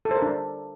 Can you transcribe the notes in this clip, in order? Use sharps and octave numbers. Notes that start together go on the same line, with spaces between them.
A4
C5
A#4
D4